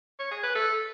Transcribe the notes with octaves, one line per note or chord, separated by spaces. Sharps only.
C#5
G#4
B4
A4